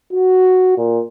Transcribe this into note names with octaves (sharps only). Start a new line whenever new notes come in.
F#4
A#2